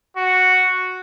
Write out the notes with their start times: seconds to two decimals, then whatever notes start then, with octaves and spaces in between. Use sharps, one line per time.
0.17 F#4